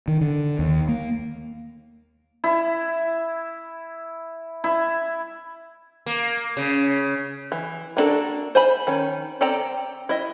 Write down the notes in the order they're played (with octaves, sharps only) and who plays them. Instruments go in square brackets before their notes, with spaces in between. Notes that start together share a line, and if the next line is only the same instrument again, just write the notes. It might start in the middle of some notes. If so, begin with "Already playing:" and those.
[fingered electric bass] D#3
D3
D#2
A#3
[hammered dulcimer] E4
E4
[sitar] A#3
C#3
[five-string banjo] E3
A#3 B3 D4 F#4 A4
C5 G#5 B5
D#3 C#4
C4 A4 D5 G5 A#5
E4 D#5